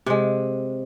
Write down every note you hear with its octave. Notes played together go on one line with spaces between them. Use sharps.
C3 G#3